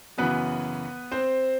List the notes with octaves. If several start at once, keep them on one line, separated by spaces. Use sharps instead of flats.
F#2 C#3 E3 B3 B4
C4 C5